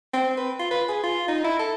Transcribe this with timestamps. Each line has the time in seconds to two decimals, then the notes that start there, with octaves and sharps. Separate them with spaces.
0.14 C4
0.37 B4
0.59 F4
0.71 B4
0.88 G#4
1.03 F4
1.28 D#4
1.44 E4
1.59 A4